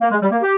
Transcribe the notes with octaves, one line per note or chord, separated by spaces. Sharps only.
A#3
G#3
G3
A#3
G4